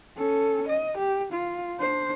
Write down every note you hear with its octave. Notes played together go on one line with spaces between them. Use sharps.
C#4 A4
D#5
G4
F4
D4 C5